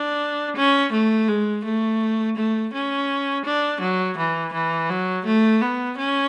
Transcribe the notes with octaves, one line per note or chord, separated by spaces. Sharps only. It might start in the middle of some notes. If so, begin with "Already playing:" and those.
Already playing: D4
C#4
A3
G#3
A3
A3
C#4
D4
F#3
E3
E3
F#3
A3
B3
C#4